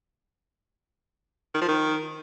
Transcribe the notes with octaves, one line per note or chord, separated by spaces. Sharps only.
D#3
F3
D#3